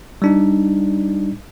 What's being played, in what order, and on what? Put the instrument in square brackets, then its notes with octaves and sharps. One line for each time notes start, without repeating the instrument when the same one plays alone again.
[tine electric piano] G3 D4 D#4